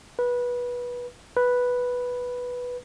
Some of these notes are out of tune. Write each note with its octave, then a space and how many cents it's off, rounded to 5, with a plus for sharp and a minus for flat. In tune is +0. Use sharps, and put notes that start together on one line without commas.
B4 -20
B4 -5